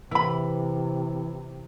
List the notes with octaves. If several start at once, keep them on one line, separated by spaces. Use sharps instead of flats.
C3 E3 E4 B5